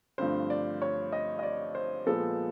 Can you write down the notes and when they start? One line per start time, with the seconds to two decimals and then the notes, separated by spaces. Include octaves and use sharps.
0.18 G2 D3 F3 A3 C4 C5
0.50 D5
0.82 C#5
1.13 D#5
1.39 D#5
1.43 D5
1.75 C5
2.06 A#2 F3 G#3 B3 A4